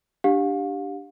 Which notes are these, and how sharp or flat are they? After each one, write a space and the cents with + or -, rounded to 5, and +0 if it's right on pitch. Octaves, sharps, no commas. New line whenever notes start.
D4 +0 G4 +0 F5 +40